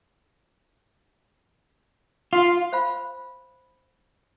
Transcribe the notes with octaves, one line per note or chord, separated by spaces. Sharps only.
F4
C5 F5 B5